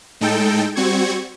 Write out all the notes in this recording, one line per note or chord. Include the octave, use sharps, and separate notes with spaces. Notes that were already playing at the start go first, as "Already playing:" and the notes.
A2 G#3 D#4 A4 G5
G3 C4 F#4 C#6 G#6